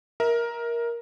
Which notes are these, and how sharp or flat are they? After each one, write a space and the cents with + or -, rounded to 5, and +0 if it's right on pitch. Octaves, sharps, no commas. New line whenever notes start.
A#4 +10 E5 -30